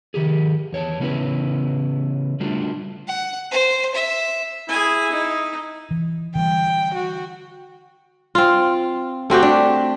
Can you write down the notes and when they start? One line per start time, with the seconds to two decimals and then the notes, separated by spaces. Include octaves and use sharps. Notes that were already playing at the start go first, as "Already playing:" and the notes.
0.14 D#3 G4 G#4
0.73 E2 C#5 G#5 A5
1.00 C#3 E3 B3 C#4 E4 B4
2.40 D3 G3 A3 D4 F4 F#4
3.08 F#5
3.51 C5
3.95 E5
4.69 E4 G#4 G#5
5.11 D#4
5.91 E3
6.35 D3 E3 G3 G5
6.95 F#4
8.35 C4 F4
9.30 A3 C4 F#4 G4
9.42 D4